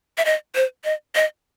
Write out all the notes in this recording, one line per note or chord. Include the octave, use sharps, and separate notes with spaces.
E5
D#5
C5
D#5
D#5